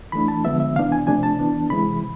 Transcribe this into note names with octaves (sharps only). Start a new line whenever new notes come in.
E3 A3 D4 B5
A5
D3 F3 G#3 B3 E5
E5
C3 E3 B3 D4 F5
G#5
C3 F3 A3 D4 G#5
A5
E3 B3 D4
C3 E3 G#3 B5